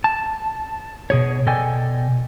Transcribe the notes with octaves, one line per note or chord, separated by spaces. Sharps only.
A5
B2 G#4 C#5
B2 A4 D5 D#5 G5 G#5